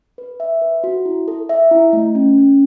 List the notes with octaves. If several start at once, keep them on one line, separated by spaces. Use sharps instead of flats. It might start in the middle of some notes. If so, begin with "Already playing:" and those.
B4
E5
B4
F#4
E4
A4
E5
E4
A3
C#4
C#4